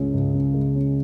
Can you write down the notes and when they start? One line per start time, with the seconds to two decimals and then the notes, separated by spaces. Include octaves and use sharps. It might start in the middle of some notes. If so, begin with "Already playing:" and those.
Already playing: C#2 C#3 G#3 C#4
0.14 C#2
0.34 C#3
0.54 G#3
0.75 C#4